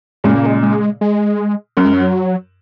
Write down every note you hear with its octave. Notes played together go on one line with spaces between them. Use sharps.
A#2 C#3 G#3
A#3
G#3
G#3
G#3
F#2 F#3
G#3
F#3